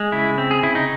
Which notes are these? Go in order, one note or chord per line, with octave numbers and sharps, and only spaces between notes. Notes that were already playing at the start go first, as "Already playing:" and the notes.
Already playing: G#3
C#3 E4
C4
G#4
C#3 E4
D#4